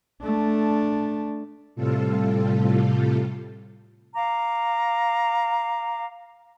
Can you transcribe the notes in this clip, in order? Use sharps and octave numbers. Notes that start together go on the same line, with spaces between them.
A3 D4
A2 C3 G3 F4 A4
F5 A#5 D6